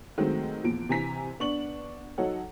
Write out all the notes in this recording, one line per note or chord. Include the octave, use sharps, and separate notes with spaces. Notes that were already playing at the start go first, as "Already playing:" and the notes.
D#3 F#3 G#3 A3 C4
E2 A#2 F3 D7
C3 E3 G#5 A#5 B6
B3 D4 C#6 F#7
F#3 D#4 A4 C#5 F#5